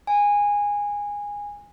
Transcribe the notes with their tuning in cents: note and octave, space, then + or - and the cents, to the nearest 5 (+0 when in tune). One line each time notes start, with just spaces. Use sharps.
G#5 -15